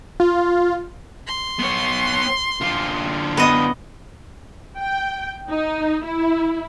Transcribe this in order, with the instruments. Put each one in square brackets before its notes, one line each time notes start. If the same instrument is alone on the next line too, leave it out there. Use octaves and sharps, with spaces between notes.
[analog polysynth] F4
[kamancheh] C6
[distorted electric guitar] B3 C#5
D3 F4
[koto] B3 D#5
[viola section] G5
D#4
E4